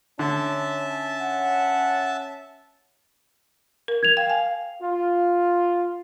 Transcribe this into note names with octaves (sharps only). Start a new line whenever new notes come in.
D3 C#4 E5 A5
F#5
A#4
G#6 F7
F5 G5
G#5
F4